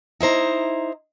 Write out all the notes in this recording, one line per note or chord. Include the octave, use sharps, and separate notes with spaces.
D#4 E4 C5 A#5